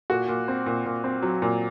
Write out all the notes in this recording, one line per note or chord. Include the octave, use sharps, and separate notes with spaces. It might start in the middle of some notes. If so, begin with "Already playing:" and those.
A#2 F#4
A#2
C4
A#2
A#2
C4
F#3
A#2